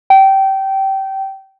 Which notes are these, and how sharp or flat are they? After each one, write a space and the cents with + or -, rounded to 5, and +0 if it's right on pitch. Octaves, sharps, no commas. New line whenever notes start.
G5 -20